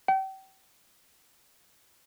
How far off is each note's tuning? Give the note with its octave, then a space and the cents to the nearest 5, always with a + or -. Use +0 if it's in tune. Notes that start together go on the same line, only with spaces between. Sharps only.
G5 -35